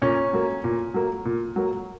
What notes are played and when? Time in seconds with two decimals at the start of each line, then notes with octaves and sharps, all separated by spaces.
0.02 A#2 C#4
0.33 F#3 A#3
0.64 A#2
0.94 F#3 A#3
1.25 A#2
1.56 F#3 A#3